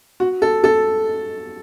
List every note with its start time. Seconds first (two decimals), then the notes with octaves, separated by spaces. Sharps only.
0.20 F#4
0.42 A4
0.64 A4